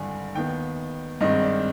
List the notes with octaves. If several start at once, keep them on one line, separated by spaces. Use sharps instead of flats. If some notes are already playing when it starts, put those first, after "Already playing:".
Already playing: G#1 G2 D3 G#5
D#2 D#3 B3 G5
G#1 G2 D#3 G#3 C4 D#5
D5